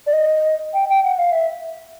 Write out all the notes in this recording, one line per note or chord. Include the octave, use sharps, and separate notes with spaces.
D5
D#5
G5
G5
F#5
F5
E5